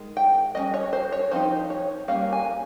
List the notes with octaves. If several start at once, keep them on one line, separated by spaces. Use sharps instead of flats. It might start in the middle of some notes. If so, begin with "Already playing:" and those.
Already playing: D#3 G#3
G5
G3 A#3 C#4 D#5
C#5
C5
C#5
F3 C4 D#4 C5
C#5
G3 A#3 C#4 F5
G#5